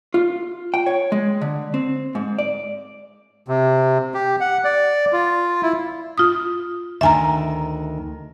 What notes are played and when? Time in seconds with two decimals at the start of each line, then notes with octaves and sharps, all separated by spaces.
0.14 F4
0.74 G5
0.86 C#5
1.12 G#3
1.41 D3
1.74 C4
2.15 G#2
2.39 D5
3.48 C3
4.14 G4
4.40 F#5
4.64 D5
5.13 F4
5.62 E4
6.18 F4 D#6
7.01 D2 D#3 E5 G#5 A#5